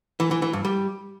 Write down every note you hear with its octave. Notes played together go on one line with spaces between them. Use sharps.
E3
E3
E3
G2
G3